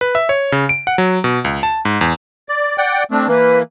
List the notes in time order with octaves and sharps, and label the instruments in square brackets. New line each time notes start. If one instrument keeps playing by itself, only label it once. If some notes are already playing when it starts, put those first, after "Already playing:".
[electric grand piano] B4
E5
C#5
C#3
D7
F#5
F#3
B2
C#2
A5
G#2
E2
[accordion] D5
D5 F#5 G5
A3 C4 D4
[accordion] E3 A#3 [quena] B4